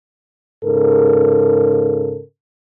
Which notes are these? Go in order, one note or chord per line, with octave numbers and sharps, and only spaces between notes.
G#2 C#3 A4 A#4